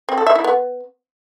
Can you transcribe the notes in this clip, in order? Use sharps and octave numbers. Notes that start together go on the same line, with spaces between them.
C4
A4
E5
E4
B3